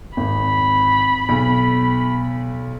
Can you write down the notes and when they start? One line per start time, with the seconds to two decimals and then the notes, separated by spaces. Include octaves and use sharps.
0.17 G#1 B5
1.29 B1